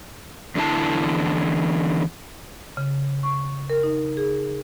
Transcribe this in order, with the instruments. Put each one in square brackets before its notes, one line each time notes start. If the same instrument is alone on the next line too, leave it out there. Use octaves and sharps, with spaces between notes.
[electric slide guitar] E2 D3 E3 E4 A5
[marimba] C#3
C#6
A#4
D#4
G#4